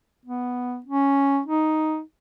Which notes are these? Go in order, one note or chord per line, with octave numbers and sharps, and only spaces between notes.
B3
C#4
D#4